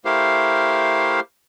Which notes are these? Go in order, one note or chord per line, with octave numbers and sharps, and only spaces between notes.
A3 E4 G4 A#4 C5 F5